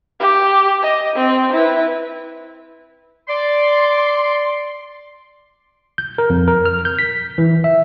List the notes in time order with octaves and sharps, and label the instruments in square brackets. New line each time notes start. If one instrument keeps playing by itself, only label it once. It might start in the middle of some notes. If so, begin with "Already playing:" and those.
[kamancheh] G4
D#5
C4
E4 B4
[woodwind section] D5 C6
[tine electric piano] G6
A#4
F2
A#4
F6
G6
B6
E3
E5